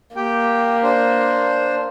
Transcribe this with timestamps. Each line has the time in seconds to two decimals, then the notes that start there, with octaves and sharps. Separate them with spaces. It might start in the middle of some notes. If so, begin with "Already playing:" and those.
0.16 A#3 G4 G5
0.83 D4 C5